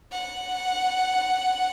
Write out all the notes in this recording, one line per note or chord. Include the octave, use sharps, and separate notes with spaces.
F#5